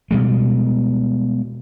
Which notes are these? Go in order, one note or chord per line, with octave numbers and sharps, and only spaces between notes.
B2 G3 G#3